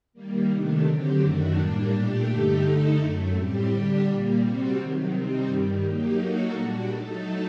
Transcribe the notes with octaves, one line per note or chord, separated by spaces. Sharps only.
D#3 G3 A#3
C3 D#3 A3 D4
D3 F#3 C4 G4
F#2 D#3 A3 D4 F#4
A2 G3 A#3 D4
A#2 A3 D4 G4
G2 D3 A3 D#4 G4
D3 A3 D#4 A4
F#2 F#3 A3
A2 G3 C4 G4
D3 G3 D4 G4
A#2 G3 A#3
C3 G3 C4 F#4
C3 D#3 F#3
C3 G3 C4 D#4
G2 D#3 G3
F#3 A#3 D#4 G4
F#3 A#3 D#4 F#4 A4
A#2 G3 D4 F#4
F#3 A3 D#4 A4